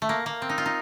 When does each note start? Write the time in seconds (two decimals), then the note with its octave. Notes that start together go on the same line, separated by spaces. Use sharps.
0.02 A3
0.09 A#3
0.26 A#3
0.42 C4
0.49 D#4
0.58 F4
0.66 D#4